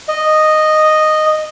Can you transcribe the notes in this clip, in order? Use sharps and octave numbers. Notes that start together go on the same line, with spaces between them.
D#5